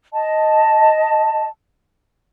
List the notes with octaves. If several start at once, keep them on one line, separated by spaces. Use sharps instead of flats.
D#5 A5